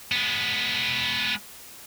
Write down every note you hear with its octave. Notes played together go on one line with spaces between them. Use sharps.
G#3 B3